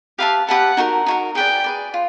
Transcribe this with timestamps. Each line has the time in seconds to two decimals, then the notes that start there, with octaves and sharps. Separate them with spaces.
0.18 G4 B4 E5 F5 A5
0.48 G4 B4 E5 F#5 A5
0.77 D#4 F#4 A#4
1.06 D#4 F#4 A#4
1.35 G#4 B4 D5 G5
1.64 G#4 B4 D5
1.94 F4